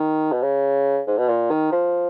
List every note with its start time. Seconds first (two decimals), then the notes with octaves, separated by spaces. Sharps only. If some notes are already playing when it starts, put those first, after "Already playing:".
Already playing: D#3
0.32 B2
0.42 C#3
1.07 G#2
1.18 B2
1.28 A#2
1.50 D#3
1.72 F3